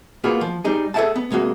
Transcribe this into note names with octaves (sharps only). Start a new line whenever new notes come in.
A#3 B3 F4 F#4 G#4
F3
G3 D#4 G#4
G#4 A4 D5 E5 F#5 A5
B3
C2 G#3 A#3 F#4